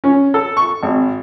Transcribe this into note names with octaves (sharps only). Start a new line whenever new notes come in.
C#4
A4
C#6
G#1